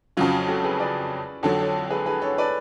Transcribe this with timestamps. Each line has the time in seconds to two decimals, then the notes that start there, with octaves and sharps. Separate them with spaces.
0.17 F2 C#3 F#3 C#4 F4
0.48 F#4 A4
0.64 G#4 B4
0.80 B4 D5
1.43 F2 D3 F#3 A4 C#5
1.59 A4 C#5
1.90 G#4 B4
2.06 G#4 B4
2.22 A4 C#5
2.38 B4 D5